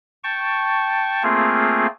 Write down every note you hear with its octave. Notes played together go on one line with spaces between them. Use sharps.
G5 A5 C#6
A3 A#3 C4 F4 G#4